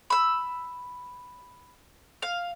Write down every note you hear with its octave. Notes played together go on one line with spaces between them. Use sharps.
B5 E6
F5